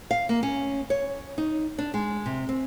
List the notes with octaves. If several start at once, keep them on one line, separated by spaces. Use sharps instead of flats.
F5
A#3
C#4
C#5
D#4
D4
G#3
C3
C4